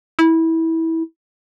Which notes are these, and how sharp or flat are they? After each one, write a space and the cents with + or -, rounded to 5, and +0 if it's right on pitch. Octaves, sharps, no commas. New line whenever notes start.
E4 -20